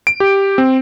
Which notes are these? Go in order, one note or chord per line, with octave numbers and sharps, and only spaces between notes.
D7
G4
C4